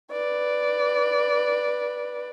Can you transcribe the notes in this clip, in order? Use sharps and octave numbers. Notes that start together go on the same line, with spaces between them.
B4 D5